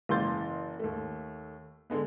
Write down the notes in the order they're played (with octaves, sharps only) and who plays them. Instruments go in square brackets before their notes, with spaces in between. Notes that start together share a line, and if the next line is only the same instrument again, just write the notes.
[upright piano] F#1 E3 A#3 C6 G6 A6
D#2 A3
D3 G#3 B3